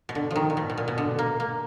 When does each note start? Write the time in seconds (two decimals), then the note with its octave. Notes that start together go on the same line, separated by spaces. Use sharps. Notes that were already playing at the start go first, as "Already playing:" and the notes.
0.09 B2
0.15 D3
0.31 F3
0.36 D#3
0.50 A#2
0.57 B2
0.70 B2
0.78 A#2
0.88 B2
0.98 D3
1.19 A#3
1.40 A#3